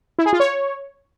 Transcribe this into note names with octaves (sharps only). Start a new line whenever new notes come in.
E4
G#4
F4
C#5